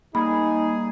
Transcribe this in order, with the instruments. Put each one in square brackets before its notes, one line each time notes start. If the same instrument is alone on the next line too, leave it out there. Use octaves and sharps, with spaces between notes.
[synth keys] G3 A#3 [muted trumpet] D#4 [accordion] G#4 [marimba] B5